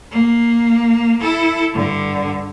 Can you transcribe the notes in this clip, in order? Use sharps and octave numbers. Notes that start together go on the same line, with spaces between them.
A#3
E4 A4
G2 D3